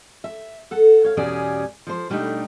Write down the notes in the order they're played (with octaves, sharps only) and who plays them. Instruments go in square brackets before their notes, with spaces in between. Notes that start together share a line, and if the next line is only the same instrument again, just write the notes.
[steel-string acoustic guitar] E5
A4 F#5
C#5 F5
E2 B2 G3 C#4 G#4 D5
F3 C5
B2 G3 A3 D4 D#4